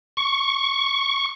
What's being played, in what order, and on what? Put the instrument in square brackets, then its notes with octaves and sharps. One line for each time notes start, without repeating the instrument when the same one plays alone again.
[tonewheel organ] C#6